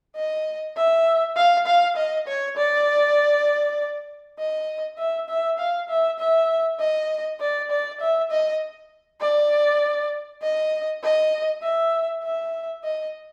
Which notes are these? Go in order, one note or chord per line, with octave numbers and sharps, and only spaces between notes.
D#5
E5
F5
F5
D#5
C#5
D5
D#5
E5
E5
F5
E5
E5
D#5
D5
D5
E5
D#5
D5
D#5
D#5
E5
E5
D#5